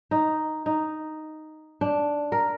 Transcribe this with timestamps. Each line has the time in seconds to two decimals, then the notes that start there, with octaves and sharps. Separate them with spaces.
0.11 D#4
0.66 D#4
1.81 D4
2.32 A#4